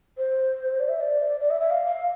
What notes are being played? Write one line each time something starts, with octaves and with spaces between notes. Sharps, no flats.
C5
D5
E5
D5
D5
E5
E5
F5
F5